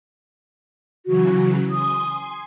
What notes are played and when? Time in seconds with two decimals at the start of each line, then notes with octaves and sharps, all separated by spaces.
1.06 C#3 E3 F#3 F#4
1.71 G#5 C6 D#6